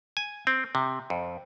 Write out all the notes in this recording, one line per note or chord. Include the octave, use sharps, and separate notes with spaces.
G#5
C4
C3
F2